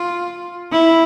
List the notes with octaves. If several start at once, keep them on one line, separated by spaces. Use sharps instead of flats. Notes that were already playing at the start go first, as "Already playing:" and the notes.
Already playing: F4
E4